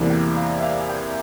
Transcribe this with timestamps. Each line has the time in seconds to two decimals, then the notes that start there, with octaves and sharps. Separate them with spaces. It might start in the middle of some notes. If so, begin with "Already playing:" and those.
Already playing: E2 C3 E3 G3 A#3
0.10 G5
0.37 F5
0.58 E5
0.62 F5
0.79 G#5
0.89 G5